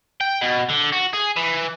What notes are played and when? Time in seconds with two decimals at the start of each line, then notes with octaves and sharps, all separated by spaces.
0.21 G5
0.41 B2
0.69 D3
0.93 F#4
1.14 G#4
1.37 E3